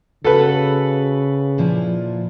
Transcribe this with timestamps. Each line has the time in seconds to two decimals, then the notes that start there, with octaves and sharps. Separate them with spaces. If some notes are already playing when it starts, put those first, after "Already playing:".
0.24 C#3 F#4 A4 B4
1.58 A#2 F3 E4